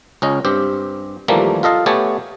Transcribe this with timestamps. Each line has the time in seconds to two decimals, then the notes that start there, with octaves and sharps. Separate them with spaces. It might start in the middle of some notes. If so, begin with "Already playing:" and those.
0.22 C#2 C#4 D#5
0.45 G2 C4 G4
1.28 D#2 E3 F3 G3 A3 A#3
1.63 F4 A4 D#5 F5
1.86 A3 B3 G4 C#5 G#5 A5